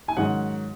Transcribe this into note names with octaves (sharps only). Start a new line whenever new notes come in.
G#5
G#2 D#3 F#3 C#4 F#5